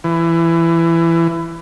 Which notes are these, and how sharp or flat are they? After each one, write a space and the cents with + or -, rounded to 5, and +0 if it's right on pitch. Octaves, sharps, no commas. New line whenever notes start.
E3 +20